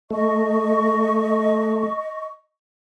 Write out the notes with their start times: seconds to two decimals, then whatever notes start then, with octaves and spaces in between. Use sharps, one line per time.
0.11 A3 D#5 C#6